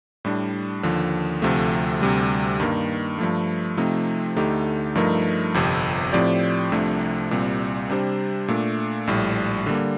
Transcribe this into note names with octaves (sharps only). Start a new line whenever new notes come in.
A2 G3 D4
D#2 D3 F3
D2 C3 F3 A3
D2 C3 G3
G2 D#3 A#3
G2 F3 A3
C3 F3 A3 C4 D#4
D2 D3 A3 D#4 G4
G2 F3 A3 D#4 A#4
G1 F2 C3
A2 F3 C4 G4 D5
C2 C3 F3 A3 D4
C2 A#2 G3 C4
C3 G3 D4 G4 C5
A#2 A3 D4
A#1 A2 G3
D3 G3 A#3